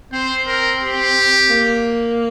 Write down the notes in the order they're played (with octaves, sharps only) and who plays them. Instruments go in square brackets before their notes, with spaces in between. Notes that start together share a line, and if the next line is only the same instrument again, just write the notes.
[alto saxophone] C4 [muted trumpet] C5
[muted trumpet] A#4
G4
[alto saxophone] A#3